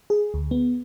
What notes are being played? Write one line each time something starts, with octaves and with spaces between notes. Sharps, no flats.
G#4
D2
B3